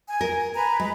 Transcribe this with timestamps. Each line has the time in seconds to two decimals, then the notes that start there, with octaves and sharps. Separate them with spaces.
0.08 G#5
0.21 A#4
0.54 B4 G#5 A#5
0.80 G#3 B4